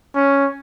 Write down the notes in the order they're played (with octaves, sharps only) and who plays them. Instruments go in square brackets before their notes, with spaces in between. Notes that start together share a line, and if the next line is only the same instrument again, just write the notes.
[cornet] C#4